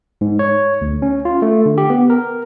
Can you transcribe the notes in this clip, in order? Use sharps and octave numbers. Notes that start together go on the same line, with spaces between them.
G#2
C#5
D2
C#4
F4
A3
D3
G4
B3
A#4